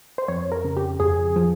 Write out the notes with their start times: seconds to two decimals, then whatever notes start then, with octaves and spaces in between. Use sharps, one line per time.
0.18 C5
0.28 F2 C#5
0.52 A#4
0.64 C#3
0.77 G4
1.00 F2 G#4
1.36 F3